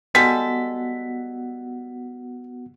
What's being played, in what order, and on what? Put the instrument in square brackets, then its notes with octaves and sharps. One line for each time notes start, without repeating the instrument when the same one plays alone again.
[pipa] G3 G#3 A4 [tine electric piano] B3 F#4 F#5 [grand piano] B6